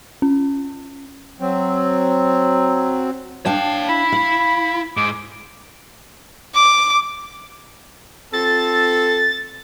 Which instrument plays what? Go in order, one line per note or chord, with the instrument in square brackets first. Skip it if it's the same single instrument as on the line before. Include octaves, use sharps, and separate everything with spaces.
[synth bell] C#4
[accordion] F#3 C4
[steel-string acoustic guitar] D4 F5 G5 [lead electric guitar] C#5 A5
[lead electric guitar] E4 [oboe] B5
[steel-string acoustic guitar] F5
[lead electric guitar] G#2 [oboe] D6
[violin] D6
[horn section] C4 F4 A4 [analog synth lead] A6